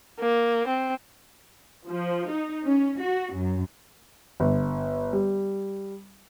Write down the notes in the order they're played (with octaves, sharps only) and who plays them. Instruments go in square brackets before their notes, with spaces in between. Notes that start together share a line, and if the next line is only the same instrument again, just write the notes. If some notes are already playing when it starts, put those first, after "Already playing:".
[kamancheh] A#3
C4
[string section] F3
D#4
C#4
F#4
F#2
[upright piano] G1
G3